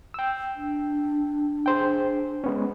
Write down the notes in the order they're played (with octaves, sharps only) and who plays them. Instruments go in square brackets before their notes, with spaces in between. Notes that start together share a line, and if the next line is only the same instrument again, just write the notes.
[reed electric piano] G5 E6
[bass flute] D4
[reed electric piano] G#4 C5 G5
G#3 B3 C#4